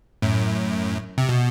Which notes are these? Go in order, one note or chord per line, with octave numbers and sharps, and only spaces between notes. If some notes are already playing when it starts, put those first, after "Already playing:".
F#2 A2
C3
B2